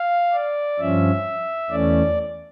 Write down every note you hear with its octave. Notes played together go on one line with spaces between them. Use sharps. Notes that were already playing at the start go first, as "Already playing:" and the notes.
Already playing: F5
D5
G2 F3 C#4 E5
E2 E3 A3 C#4 D5